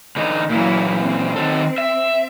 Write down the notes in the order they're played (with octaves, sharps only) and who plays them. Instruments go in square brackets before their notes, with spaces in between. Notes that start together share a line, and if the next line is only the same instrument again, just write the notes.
[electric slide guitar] D3 E3 D#4
[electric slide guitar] A#2 E3 [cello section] F#3 A#3 E4
[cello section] C4
[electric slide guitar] D#3 F#3 A4
E5